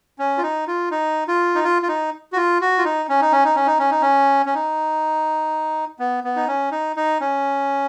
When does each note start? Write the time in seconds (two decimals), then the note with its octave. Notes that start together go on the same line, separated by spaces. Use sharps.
0.19 C#4
0.38 F4
0.43 D#4
0.67 F4
0.91 D#4
1.28 F4
1.55 D#4
1.64 F4
1.82 F4
1.88 D#4
2.33 F#4
2.37 F4
2.61 F#4
2.78 F4
2.85 D#4
3.09 C#4
3.21 D#4
3.32 C#4
3.44 D#4
3.55 C#4
3.67 D#4
3.79 C#4
3.91 D#4
4.02 C#4
4.46 C#4
4.54 D#4
5.99 B3
6.24 B3
6.36 D#4
6.48 C#4
6.72 D#4
6.96 D#4
7.21 C#4